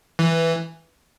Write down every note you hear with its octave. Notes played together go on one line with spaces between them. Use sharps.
E3